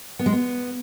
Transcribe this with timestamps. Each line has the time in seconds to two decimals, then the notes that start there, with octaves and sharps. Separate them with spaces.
0.19 B3
0.26 G#3
0.33 B3